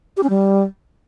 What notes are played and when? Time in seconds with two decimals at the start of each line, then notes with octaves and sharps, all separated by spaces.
0.17 G4
0.23 C#4
0.30 G3